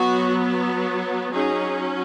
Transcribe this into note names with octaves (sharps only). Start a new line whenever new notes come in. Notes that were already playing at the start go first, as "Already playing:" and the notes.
Already playing: F#3 B3 F#4
F#3 C#4 D#4 G#4